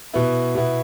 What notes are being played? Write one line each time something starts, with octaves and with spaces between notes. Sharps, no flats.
B2 B3 E4
B2 B3 E4